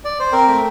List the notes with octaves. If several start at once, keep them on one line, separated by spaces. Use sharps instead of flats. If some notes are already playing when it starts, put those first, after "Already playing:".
D5
C5
C4 A#4
A3